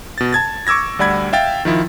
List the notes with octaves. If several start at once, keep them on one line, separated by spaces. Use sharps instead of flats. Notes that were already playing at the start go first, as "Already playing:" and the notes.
B2 A6
A5 G#6 A6
C#6 D6 E6 G#6 A#6
D2 G3 D5 F#5 B5 G#6
E5 F5 G5 A6
D#3 F3 E4